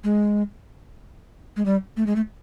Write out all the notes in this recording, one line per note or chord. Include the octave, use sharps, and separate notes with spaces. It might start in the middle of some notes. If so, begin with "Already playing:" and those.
G#3
G#3
G3
A3
G#3
A3